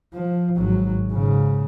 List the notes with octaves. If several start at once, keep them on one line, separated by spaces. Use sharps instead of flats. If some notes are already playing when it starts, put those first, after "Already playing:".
F3
G#1 F#3
G#2 C#3